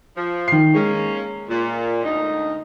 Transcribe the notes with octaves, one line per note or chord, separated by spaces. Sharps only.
F3
D#3 C7
G#3 A#3 C#4
A#2
D2 D#4